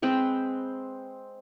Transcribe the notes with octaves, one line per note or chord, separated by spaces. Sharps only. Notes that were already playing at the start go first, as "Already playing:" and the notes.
G#3 C4 B4 G5